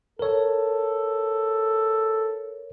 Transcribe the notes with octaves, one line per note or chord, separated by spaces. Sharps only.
A4 A#4 C#5